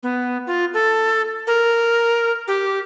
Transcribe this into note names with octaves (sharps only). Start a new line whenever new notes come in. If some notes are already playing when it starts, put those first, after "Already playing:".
B3
F4
A4
A#4
G4